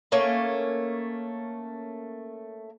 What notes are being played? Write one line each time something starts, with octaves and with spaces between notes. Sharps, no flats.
A3 A#3 C#4